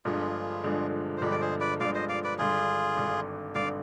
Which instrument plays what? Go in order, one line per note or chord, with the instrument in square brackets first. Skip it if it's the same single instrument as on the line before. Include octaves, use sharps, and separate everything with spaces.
[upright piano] G1 G2 D3 F3 G#3 [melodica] F4 G#4
[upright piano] G1 G2 D3 F3 G#3
[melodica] C5
[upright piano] G1 G2 D3 F3 G#3 [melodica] G4 B4
[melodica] D5
G#4 C5
B4 D5
[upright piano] G1 G2 D3 F3 G#3 [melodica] D5 F5
[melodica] C5 D#5
D5 F5
B4 D5
[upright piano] G#1 G2 D3 [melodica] F4 G#4
[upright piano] G#1 G2 D3
[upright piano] G#1 G2 D3 [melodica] D5 F5